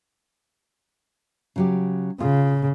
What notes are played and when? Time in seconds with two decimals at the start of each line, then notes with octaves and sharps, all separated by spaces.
1.56 C#3 F#3 G4
2.20 C#3 F4